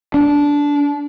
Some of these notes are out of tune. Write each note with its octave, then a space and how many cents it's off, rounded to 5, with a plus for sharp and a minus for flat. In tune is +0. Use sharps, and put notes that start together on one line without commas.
D4 -15